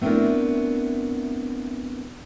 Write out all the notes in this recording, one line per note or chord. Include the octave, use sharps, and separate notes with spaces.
A3 B3 C4 D4 E4 A#4